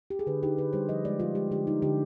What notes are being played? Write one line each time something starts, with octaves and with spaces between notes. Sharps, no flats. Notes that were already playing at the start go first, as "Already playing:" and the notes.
G4
G#4
D3 B4
D#4 G4
D3 B4
G3 C5
F3 D#5
G#3 D5
F3 F4
G#3 G4
D3 G4
D#4
D3 G4